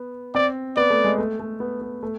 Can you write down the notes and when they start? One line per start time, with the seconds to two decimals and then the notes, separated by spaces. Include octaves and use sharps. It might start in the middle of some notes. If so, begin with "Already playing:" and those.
Already playing: B3
0.34 C4 D5
0.77 B3 D5
0.90 A3
1.04 G#3
1.18 A3
1.40 A3
1.60 B3
1.81 B3
2.03 A3